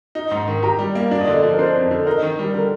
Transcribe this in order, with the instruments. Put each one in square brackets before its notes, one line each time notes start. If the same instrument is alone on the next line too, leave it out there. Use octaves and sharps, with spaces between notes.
[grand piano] D#4
G#2
D#3
[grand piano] G4 [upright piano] A#5
[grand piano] G3
A#3
[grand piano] D4 [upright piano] D5
[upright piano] D#5
[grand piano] D3 [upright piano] D5
[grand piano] F3
[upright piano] A#4
[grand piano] D4 [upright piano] C5
[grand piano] F2
D3
[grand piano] D#4 [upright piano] A#4
[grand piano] D#3
G3
[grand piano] D3 [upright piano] A#4